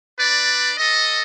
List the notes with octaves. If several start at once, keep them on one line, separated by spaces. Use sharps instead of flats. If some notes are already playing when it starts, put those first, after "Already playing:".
D4 B4 D5
A4 D#5